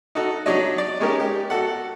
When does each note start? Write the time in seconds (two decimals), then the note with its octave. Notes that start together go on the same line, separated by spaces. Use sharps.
0.15 D#4 F#4 A4
0.46 F#3 D4 D#4 C#5 D#5
0.78 D5
1.00 G#3 C#4 D#4 G4 A#4
1.20 G4
1.50 F#4 A4 F#5